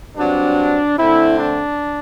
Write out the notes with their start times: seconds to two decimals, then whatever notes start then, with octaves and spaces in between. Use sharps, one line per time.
0.16 G2 F#3 C4 D4
0.97 D3 A3 C4 E4
1.37 D4